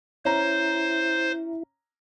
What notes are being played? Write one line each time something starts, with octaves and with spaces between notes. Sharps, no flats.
C#4 E4 C5 A#5